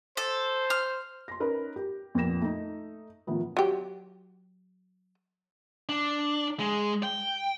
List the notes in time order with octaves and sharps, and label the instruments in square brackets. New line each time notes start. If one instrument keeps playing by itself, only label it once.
[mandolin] A4 [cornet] C5
[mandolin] F6
[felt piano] C6 A#6
C#4 D#4 A#4 B4
G4
F2 A#2 A#3 B3 A#6 E7
A3 D#4
A2 D#3 F3 B3
[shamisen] F#3 G4
[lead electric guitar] D4
G#3
G5